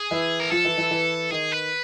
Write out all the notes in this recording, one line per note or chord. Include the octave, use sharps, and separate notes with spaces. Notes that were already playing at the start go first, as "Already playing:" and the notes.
Already playing: G#4
E3 E4
A#4
F3 F4 A4
E3 E4
E3 E4
E3 E4
D#3 D#4 G#4
B4